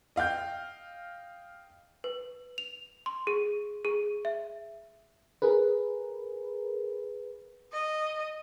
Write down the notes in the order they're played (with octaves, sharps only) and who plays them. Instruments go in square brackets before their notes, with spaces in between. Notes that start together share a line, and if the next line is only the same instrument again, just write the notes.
[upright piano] D#5 F5 G5 G6
[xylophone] B4
F7
C6
G#4
G#4
E5
[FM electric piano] G#4 A#4 B4
[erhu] D#5